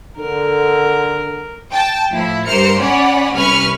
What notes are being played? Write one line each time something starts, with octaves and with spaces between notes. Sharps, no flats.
D3 A#4
G5 A5
A2 F3 E4
G2 A#4 C5 C6 F6 C#7
C#4 C#5 D5 F#5 G#5 B5
C2 C#4 B4 B5 C#6 F6